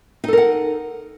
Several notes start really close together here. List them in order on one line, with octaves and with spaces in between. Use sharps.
D#4 A4 A#4 F#5